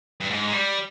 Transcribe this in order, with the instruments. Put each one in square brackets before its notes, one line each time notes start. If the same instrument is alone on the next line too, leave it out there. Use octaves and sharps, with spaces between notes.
[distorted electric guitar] G2
G#2
G#3
G3